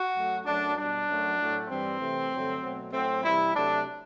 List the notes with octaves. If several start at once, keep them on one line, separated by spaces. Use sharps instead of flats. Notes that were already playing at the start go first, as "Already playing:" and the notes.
Already playing: F#4
F#2 F#3 A3
F#2 F#3 A3 D4
B2 G3 D4
F#2 F#3 A3
A2 F#3 A3
G2 E3 G3 C4
C3 E3 A3
G2 D3 F#3 A3
B2 F#3 A3
A2 F#3 A3 C4
C3 E3 G3 E4
C3 F#3 A3 D4